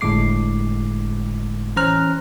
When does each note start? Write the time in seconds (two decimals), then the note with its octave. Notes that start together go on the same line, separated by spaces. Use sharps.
0.01 G1 A2 D3 G#3 D6 C7
1.76 E3 C#4 C5 A#5 F6 F#6